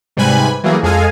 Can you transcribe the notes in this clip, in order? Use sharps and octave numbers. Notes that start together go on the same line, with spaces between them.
G#2 C3 G3 B4 G#5 B5
E3 F#3 G3 A3 A#3 G#4
F2 G#3 G#4 A4 F5 G#5